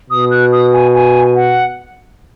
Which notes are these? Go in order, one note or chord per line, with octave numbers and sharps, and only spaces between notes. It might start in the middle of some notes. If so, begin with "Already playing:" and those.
B2 D#6
F#6
D#6
G#5
G#5
F#5